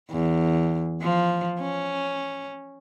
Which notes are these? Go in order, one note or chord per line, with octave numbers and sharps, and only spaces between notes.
E2
F3
C#4